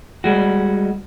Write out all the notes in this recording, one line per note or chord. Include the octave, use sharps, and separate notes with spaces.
G3 G#3 F#4